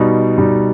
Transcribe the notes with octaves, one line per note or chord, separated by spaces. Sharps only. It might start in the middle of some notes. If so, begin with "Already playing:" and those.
Already playing: B2 G3 D#4
B2 G3 D#4